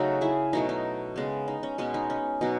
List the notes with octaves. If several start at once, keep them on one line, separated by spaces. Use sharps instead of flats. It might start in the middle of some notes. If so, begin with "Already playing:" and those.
Already playing: C#3 F#3 A3 C#4 D#4 F#4 A4
E4 G#4
B2 F#3 A3 D#4
D#4
C#3 G#3 B3
D#4
C#4
B2 G#3 B3 C#4
D#4
C#4
B2 F#3 D#4